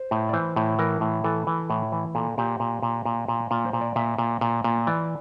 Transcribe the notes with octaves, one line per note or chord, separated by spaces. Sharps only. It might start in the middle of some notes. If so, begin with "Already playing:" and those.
Already playing: C5
A2
D5
E3 C5
A2
E3 A#4
A2
E3 A4
E3
A2
E3
A#2 A4
A#2 G4
A#2
A#2
A#2
A#2
A#2 F4
C5
A#2
D5
A#2 E5
A#2
A#2
A#2
E3 D5